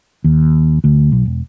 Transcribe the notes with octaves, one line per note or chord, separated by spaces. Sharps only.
D#2
D2
B1
E1